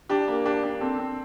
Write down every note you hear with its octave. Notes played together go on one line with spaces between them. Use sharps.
D4 G4
A#3
D4 G4
D4
C4 A4
C4